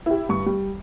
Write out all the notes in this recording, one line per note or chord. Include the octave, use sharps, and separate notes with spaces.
E4 G4
G2 C#6
G3